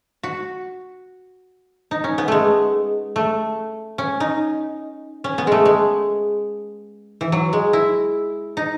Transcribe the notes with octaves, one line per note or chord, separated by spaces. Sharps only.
F#4
D#4
C#4
B3
G#3 A3
A3
C#4
D#4
C#4
B3
G#3 A3
G#3
E3
F#3
G#3
E4
D#4